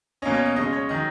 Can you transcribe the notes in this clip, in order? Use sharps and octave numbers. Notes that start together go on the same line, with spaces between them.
B2 A#3 C#4 D#5
C#5
D#5
C#3 G#3 C#4 D#5
C#5
D#3 F#3 D#5